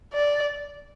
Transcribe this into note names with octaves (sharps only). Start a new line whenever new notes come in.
D5